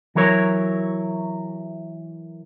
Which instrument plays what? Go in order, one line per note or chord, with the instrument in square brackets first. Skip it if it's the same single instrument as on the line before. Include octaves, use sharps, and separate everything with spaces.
[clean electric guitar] E3 F#3 E4 A#4 C#5